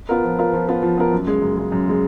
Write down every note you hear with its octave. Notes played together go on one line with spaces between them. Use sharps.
B3 F4 A#4
F3
B3 F4 A#4
F3
B3 F4 A#4
F3
B3 F4 A#4
F#2
C#3 G#3
F#2
C#3 G#3
F#2
C#3 G#3